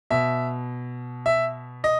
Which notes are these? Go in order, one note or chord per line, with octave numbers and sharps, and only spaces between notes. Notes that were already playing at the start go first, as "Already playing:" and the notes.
B2 E5
E5
D#5